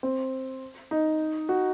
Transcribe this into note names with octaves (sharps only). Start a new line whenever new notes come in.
C4
D#4
F#4